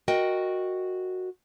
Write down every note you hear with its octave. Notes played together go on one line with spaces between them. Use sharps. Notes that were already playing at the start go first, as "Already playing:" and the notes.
F#4 A#4 D#5 G5